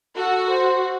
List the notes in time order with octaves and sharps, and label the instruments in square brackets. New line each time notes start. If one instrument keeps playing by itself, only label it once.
[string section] F#4 [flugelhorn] A4
[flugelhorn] C5